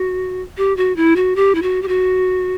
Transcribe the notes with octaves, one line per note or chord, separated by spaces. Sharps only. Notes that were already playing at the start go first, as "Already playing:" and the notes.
Already playing: F#4
G4
F#4
E4
F#4
G4
E4
F#4
G4
F#4